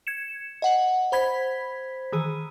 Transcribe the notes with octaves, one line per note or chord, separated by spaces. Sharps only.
G#6 C#7 E7
D#5 F#5 F#7
C5 B5 G#6 B6
D#3 E3 G#4 D#7